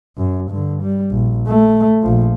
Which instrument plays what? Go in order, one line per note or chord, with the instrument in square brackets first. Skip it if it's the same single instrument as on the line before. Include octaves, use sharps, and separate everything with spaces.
[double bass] F#2
G2 D3
G3
A#1
A3
A#1 F3